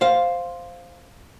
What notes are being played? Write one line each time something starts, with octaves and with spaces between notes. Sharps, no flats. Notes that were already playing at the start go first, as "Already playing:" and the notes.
C5 F5